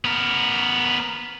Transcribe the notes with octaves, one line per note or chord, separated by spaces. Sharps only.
B3 A#4